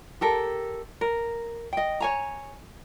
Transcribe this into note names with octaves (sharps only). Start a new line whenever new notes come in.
G4 A4 A#4
A#4
D#5 G5
C#5 G#5 A#5